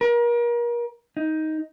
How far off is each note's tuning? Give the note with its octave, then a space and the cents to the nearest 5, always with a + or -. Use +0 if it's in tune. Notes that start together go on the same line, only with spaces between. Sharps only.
A#4 +35
D#4 +10